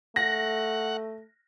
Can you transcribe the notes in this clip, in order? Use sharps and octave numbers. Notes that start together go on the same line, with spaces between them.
A3 F#5 A#6